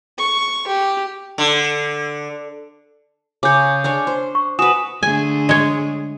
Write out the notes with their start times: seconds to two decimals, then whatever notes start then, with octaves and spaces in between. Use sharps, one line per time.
0.18 C#6
0.67 G4
1.38 D3
3.43 C#3 C#5 D6 G6
3.84 C#4 D4 C#5
4.07 C5
4.35 C#6
4.59 F#4 B4 G#5 D#6 E7
5.03 D3 A3 G#4 G#5
5.49 G#3 C#5